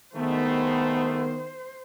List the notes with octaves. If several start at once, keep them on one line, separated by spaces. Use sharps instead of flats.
C2 D#3 G#3 A3 B3 C5